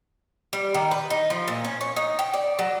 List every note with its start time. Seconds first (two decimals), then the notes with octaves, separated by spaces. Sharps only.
0.53 G3
0.74 D#3
0.91 B4
1.10 D#4
1.30 F3
1.48 A#2
1.64 C#4
1.81 C#5
1.96 D#4
2.19 G5
2.34 D5
2.59 F#3